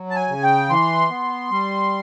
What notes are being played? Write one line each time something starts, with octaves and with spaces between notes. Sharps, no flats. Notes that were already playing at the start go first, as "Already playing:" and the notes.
Already playing: F#3
A5
G#5
C#3
G5
E3 C6
B3
G3